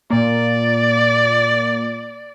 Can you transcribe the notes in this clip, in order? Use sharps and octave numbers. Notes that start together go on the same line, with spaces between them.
A#2 A#3 D5